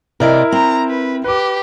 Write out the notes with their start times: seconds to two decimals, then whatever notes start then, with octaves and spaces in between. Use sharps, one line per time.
0.20 C3 E4 A#4 D5 D#5
0.52 C4 A#5
0.89 B4
1.24 G4 B4 D6